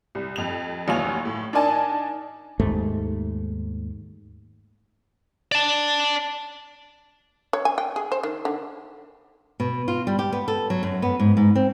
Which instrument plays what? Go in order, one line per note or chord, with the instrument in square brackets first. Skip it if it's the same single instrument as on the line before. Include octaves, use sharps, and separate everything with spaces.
[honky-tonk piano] C2
F2 F7
A1 D#2 F#3 F4 G#5 F7
A2
D4 D#4 A#4 D5 G#5 A5
[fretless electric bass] D#2 G#2 A3
[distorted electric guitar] D5 A5
[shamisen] C#5
G#5
G5
G#4
C5
D#3
D3
[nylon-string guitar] B2
F4
G3
G4
B3
A4
F#3
F#2
B3
G#2
G#2
C4